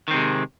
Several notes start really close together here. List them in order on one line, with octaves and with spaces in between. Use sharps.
D#3 C4 C3 G#3